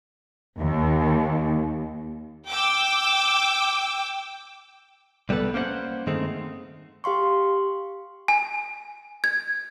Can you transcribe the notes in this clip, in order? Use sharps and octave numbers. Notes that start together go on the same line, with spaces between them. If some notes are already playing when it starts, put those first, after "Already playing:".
D#2
G5 D6 E6
C2 G3 B3 A4 B4
A#3 C#4 C5 D#5 F#5
G2 D#3 G#3 A3 C4
G4 F5 C6 C#6
G#5
G#6